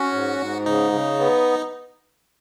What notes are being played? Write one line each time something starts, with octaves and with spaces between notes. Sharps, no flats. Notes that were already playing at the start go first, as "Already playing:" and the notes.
Already playing: C#4 F#4
G#2
G#2
C#3 D#4
C#3
B3